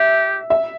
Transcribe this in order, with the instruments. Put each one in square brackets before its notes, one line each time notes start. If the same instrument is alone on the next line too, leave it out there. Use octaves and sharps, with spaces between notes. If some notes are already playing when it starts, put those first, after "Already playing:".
Already playing: [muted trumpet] G4 [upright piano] E5
[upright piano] E5